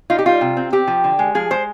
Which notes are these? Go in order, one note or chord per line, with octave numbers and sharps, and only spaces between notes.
D#4 F4
G4
G3 F4
C3
C4
C4 G4
F3
D3
G#3
F3 G#4
G#3 C5